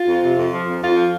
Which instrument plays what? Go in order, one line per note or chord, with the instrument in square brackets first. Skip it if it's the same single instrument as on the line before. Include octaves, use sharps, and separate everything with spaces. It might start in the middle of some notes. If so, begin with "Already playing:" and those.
Already playing: [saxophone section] F4
F2
C3
F2
F3
F2
F2 F4
F3